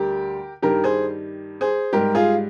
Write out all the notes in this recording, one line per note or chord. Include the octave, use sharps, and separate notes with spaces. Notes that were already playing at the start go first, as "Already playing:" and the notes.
Already playing: D2 D3 G3 G4 A#4
G2 D#3 G3 G4 A#4
G#4 C5
G#4 C5
G#2 G3 G4 A#4
F4 G#4